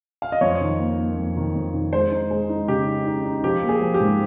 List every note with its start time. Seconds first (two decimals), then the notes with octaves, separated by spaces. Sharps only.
0.22 F5
0.32 D#5
0.41 F2 C#5
0.61 D#3
0.79 A#3
0.99 A#3
1.17 F2
1.37 D#3
1.55 F2
1.74 D#3
1.93 G#3 C5
2.11 D#4
2.31 G#3
2.49 D#4
2.68 C#3 G4
2.87 D#4
3.07 D#4
3.25 D#4
3.44 F3 G4
3.63 A#3
3.69 G#4
3.81 F3
3.94 G4
4.00 G#2